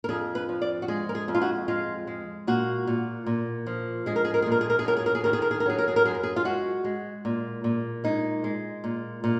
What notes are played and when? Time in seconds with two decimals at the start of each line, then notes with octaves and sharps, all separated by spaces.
0.04 A#4
0.09 F2 G#4
0.35 B4
0.49 F3
0.62 D5
0.82 F#4
0.88 G#3 G#4
1.09 A#4
1.15 G#4
1.28 F2
1.35 F4
1.42 F#4
1.68 G#3 F4
2.07 G#3
2.47 A#2 F#4
2.87 A#2
3.26 A#2
3.67 F3
4.06 G#3 G#4
4.16 A#4
4.25 G#4
4.34 A#4
4.42 G#4
4.46 A#2
4.52 A#4
4.61 G#4
4.70 A#4
4.79 G#4
4.86 F#2 A#4
4.97 G#4
5.06 A#4
5.15 G#4
5.24 D#3 A#4
5.33 G#4
5.42 A#4
5.51 G#4
5.60 A#4
5.66 F#3 G#4
5.78 A#4
5.88 G#4
5.96 A#4
6.05 F#2 G#4
6.15 A#4
6.23 G#4
6.36 F4
6.45 G#3 F#4
6.85 G#3
7.25 A#2
7.64 A#2
8.04 G#3 D#4
8.44 G#3
8.84 A#2
9.24 A#2